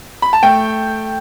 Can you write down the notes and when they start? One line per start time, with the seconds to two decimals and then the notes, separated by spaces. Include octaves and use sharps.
0.22 B5
0.33 A5
0.43 A3 G5